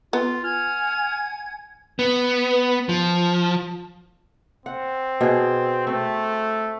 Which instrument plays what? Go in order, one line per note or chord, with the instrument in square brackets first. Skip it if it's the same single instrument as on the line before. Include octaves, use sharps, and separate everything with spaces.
[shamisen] B3 [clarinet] F4
[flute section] F#5 G#5 G#6 [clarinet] F6
[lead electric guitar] B3
F3
[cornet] C4 [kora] F#5
[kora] B2 G#4
[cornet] A3 [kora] C4